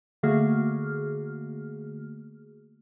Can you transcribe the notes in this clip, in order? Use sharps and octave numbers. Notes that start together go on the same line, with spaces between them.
D3 A3 A#3 F#4 G#4 F6